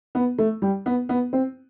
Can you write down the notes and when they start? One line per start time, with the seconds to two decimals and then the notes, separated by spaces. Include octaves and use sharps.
0.15 B3
0.38 A3
0.62 G3
0.86 B3
1.09 B3
1.33 C4